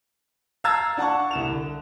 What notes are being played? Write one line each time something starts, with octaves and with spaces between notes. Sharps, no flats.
F5 A5 A#5 E6 G#6 A6
D4 F#5 A5 C#6
C2 E7 F7
D3